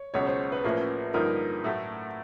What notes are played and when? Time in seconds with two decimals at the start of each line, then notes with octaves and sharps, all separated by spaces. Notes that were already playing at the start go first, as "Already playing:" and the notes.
Already playing: C#5
0.14 C#2 B2 F#3 C#5
0.27 C5
0.52 B4
0.64 A1 A2 F3 A#3 C#4 B4
1.14 G2 D3 F3 A#3 D#4 A#4
1.64 A2 F#3 A3